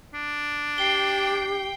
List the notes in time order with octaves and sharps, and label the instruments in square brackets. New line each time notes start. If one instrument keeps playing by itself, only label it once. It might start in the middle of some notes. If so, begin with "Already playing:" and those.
[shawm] D4
[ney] G4 [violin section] G5 [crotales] C7 G7